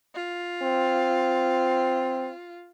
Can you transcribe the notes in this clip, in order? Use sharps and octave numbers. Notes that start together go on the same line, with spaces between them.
F4
C4